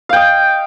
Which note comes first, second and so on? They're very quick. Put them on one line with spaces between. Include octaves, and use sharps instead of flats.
F5 G5 D#5